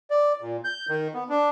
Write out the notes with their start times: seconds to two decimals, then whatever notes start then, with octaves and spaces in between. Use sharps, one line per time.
0.10 D5
0.41 A#2
0.64 G6
0.89 D#3
1.14 B3
1.29 D4